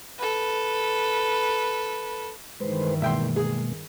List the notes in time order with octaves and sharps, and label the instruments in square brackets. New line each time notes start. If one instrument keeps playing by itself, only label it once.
[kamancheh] A4 B4
[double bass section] G2 D#3 E3 [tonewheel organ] G#3 B4 C5
[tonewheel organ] B2 G#3 A#3 [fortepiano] E5 G5 C6
[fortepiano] G#4